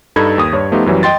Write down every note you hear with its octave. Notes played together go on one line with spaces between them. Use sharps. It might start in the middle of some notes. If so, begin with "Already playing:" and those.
G2 D#4 A4 B5 E6 G#6
D#2 D#6
G2 C#5
F3 A3 B3 D#4 F4 G4
F#2 E3 F#3 G3
D#5 G5 C6 A6